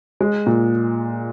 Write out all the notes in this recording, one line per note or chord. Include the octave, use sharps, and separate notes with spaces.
G#3
A#2